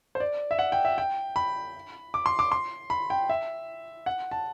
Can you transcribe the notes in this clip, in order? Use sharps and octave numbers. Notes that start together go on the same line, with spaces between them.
C5
D5
E5
F#5
G5
E5
G5
B5
D6
C6
D6
C6
B5
G5
E5
F#5
A5